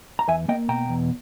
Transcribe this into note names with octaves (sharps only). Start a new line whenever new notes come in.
A#5
E2 E5 G#5
A#3 D#5 G5
B2 G5 A#5
E2